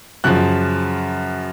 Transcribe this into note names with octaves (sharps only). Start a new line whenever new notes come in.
F#2 C#3 F3 F#6